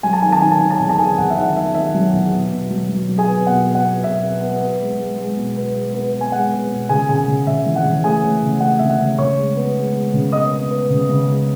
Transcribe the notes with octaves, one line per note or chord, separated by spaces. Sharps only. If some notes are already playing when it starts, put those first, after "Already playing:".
F#3 G#5
A5
D#3 G#5
A5
D#3 G#5
A5
D#3 G#5
A5
E2 G#5
A5
D#3 G#4 G#5
E2 F#5
E5
D#3 F#5
D#3 E5
D#3 E5
F#3
E2
B2
B2
F#3
F#3
F#3
G#4 G#5
B3
B2 F#5
B3
F#5
B3
B2 E5
B3
B3
B3
G#3
G#3
G#3
B2
B3
G#3
B3
B3
G#5
G#3 F#5
B3
B2
C#3 G#4 G#5
C#3 G#4 G#5
C#3
C#3 E5
E3
F#5
E3
A3 G#4 G#5
A3
C#3
A3 F#5
C#3 E5
F#5
C#3
C#3 C#5 C#6
G#3
B3
G#3
G#3
C#3
B3 D#5 D#6
B3
B3
C#3
C#3
G#3